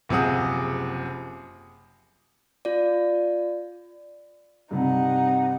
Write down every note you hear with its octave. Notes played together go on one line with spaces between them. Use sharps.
F#1 C3 F3 G#4 F#5 D#6
F4 D5
G2 C3 C4 D#4 F#5